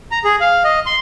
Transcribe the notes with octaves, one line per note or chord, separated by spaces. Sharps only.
A#5
G#4
F5
D#5
C6